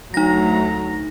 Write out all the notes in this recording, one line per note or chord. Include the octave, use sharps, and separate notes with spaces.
D2 F#3 A3 D#4 A#5 A#6